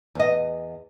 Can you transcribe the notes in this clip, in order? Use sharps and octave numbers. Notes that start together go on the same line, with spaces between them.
E2 D#5